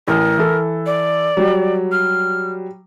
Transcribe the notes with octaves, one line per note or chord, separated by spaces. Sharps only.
A1 A#4
E3 A4
D5
F#3 G3
F6